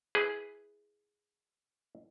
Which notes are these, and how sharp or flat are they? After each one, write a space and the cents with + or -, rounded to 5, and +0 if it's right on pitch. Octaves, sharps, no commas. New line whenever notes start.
E4 -15 G#4 +0 B4 +0